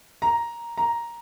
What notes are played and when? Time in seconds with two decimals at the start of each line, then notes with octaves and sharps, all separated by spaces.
0.22 A#5
0.78 A#5